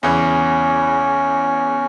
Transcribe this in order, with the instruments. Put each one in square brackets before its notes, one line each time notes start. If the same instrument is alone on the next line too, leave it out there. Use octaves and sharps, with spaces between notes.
[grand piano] E2 C#3 E3 [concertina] C#4